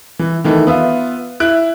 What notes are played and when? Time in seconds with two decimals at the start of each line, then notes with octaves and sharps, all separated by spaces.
0.19 E3
0.44 D#3 E3 A3
0.67 B3 F4 E5
1.40 E4 F#6 D7